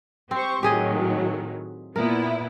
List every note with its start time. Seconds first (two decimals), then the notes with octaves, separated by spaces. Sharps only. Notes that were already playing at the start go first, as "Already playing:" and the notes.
0.31 C4 G4 C5 C#6
0.63 A2 D#3 F#3 G4 G#4 D#5
1.96 A#2 B3 E4 A#4